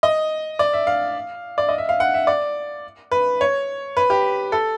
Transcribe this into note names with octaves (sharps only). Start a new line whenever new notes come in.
D#5
D5
E5
F5
D5
D#5
E5
F5
F#5
E5
D5
B4
C#5
B4
G4
A4